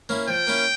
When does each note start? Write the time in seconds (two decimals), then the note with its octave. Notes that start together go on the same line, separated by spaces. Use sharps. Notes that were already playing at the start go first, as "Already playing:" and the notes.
0.09 A#3 C#4 E4
0.28 F3 G5
0.47 A#3 C#4 E4